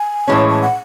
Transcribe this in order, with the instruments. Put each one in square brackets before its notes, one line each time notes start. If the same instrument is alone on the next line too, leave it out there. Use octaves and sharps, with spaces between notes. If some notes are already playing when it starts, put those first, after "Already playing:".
Already playing: [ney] G#5
[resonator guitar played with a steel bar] A2 E3 G#3 C#4 [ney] A5
[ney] A5
F#5